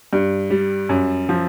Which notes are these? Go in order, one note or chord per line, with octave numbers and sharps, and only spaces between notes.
G2
G3
F#2
F3